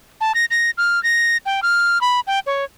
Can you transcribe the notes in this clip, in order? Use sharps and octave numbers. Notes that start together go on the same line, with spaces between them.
A5
A#6
A#6
F6
A#6
G5
F6
B5
G5
C#5